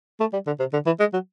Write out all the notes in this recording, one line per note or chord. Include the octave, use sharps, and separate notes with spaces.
A3
G3
D3
C3
D3
E3
G#3
F#3